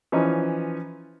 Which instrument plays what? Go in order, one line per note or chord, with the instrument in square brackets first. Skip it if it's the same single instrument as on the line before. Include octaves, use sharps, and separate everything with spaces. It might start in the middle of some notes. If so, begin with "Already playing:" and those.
[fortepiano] E3 F3 C#4 D#4